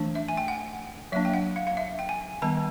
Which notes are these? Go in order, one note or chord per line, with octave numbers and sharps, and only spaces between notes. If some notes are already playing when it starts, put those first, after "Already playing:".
Already playing: E3 A3 D4
E5
G#5
G5
F#5
F#3 A#3 D4 E5
G5
F#5
F5
F5
E5
G5
G#5
D#3 G3 B3 A5